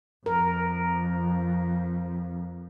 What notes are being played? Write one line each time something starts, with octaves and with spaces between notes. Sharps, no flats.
F2 A#4